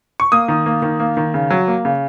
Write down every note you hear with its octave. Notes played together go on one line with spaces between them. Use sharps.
C#6
A#3 D#6
D#3
A#3
D#3
A#3
D#3
C#3
F#3
A#3
C#3